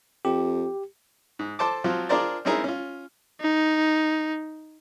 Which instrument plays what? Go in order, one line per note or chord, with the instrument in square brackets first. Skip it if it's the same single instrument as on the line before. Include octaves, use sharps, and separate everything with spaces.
[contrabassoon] F2 [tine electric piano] G4
[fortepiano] G#2
A4 C5 A5 D6
F3 F#3 C4 F4
D4 F4 G#4 A#4 C5 D5
C4 C#4 D#4 E4 G#4 A#4
C#4 F4
[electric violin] D#4